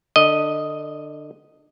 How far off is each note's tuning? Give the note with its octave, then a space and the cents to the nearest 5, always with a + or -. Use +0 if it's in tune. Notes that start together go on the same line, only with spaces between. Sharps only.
D3 +25 D#5 +0